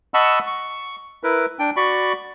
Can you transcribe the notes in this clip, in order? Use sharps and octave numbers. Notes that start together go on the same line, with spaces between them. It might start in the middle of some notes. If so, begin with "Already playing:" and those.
D#5 F#5 A5 B5 C#6 E6
C#6
E4 A#4 B4
D4 G5
F#4 D5 B5 C#6